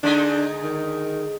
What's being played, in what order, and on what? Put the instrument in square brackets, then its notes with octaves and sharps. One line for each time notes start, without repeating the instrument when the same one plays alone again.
[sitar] D3 G#3 D#4 [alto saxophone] D4
[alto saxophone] D#3